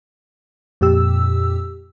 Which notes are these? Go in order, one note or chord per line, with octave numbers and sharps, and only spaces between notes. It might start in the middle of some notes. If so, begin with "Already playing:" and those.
F2 A#2 G4 E6